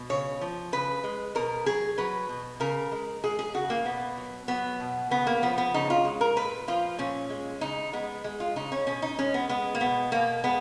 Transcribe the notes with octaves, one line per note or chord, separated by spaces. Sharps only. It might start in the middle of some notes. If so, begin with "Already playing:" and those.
Already playing: B2
C#3 C#5
F3
C#3 B4
G#3
B2 A#4
F#3 G#4
F#3 B4
B2
C#3 A#4
G#3
G#3 G#4
G#4
C#3 F#4
A#3
B2 B3
F#3
F#3 B3
B2
C#3 B3
A#3
F3 B3
B3
C#3 D#4
F4
G#3
A#4
A#2 B4
F3 F4
A#2 C#4
G#3
C#3 D#4
G#3 B3
G#3
F4
C#3 D#4
C#4
B2 C#4
D#4
G#3 C#4
B3
G#3 B3
A#3
B2 B3
B2 A#3
G#3 B3